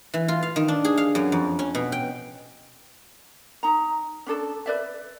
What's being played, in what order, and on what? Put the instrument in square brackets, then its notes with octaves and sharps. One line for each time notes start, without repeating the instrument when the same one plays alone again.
[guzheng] E3
F4
F5
D#3
D4
G#4
F5
F#2
F2
C#4
B2
G5
[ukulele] D#4 A#5
C#4 D4 A4 A5
B4 D5 E5